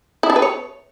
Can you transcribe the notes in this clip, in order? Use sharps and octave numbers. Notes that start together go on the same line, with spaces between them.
E4
D4
B4
C#5